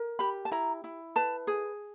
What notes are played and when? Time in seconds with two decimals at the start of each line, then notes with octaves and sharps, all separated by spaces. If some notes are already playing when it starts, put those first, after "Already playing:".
Already playing: A#4
0.19 G4 B5
0.45 A5
0.51 E4 A#5
0.84 E4
1.16 B4 A5
1.47 G#4